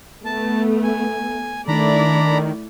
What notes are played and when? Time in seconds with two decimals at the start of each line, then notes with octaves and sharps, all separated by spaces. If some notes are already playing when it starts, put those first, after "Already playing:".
0.25 A3 B3 A5
0.84 G#5
1.68 D#3 A3 D4 E4 D5 A#5 B5